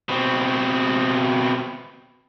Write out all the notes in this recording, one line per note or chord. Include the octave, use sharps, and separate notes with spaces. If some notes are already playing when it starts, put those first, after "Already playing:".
B2 C4